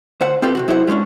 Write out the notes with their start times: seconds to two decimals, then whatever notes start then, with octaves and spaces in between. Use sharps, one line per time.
0.21 D2 C5 F#5
0.42 C4 F4 G4 A4 B4
0.55 C3 D#3 F#4
0.68 F#3 E4 G#4 C5 D#5 F#5
0.87 G3 G#3 A#3 C#4 D4